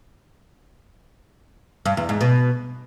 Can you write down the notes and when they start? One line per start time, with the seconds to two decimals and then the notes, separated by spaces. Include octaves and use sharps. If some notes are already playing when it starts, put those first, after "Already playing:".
1.86 G2
1.97 E2
2.09 G#2
2.21 B2